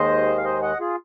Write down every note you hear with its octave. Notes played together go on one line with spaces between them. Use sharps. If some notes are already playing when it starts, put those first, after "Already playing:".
Already playing: D#2 D#3 G#3 C5 D#5
F5
C5 D#5
D#5 F#5
F4 G#4